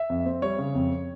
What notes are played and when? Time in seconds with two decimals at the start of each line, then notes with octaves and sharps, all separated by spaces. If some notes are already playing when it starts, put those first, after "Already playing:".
Already playing: E5
0.10 F2
0.26 C4
0.42 G3 C#5
0.59 C#3
0.75 F2